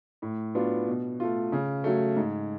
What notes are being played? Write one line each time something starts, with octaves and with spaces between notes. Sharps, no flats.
A2
F#3 B3 D4 F4
B2
A3 F4
C#3
F#3 A3
G#2